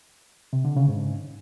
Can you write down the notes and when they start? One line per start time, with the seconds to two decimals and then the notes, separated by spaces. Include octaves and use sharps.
0.53 C3
0.65 D3
0.76 C#3
0.88 G#2